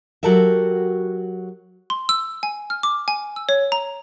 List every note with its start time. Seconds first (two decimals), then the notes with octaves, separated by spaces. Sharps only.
0.23 F#3 F#4 G4 A4 A#4 E5
1.90 C6
2.09 E6
2.43 G#5
2.70 F6
2.83 D6
3.08 G#5
3.36 E6
3.49 C#5
3.72 A#5